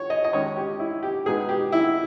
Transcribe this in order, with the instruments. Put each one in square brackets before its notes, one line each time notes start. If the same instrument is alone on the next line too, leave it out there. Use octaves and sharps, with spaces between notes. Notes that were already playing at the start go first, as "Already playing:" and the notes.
Already playing: [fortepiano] C#5
D#5
D#5
D#3 G#3 C#4 C#5
G4
E4
G4
B2 G#3 B3 D#4 G#4
G4
E4